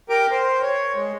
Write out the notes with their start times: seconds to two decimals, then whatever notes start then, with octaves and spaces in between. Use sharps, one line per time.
0.09 G4 A#4 D6
0.31 C5
0.62 C#5
0.95 G#3